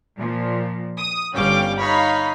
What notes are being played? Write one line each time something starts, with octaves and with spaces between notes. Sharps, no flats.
A#2 F3
D#6
G1 G3 C#4 F5 G5 D6
D#4 C#5 F5 B5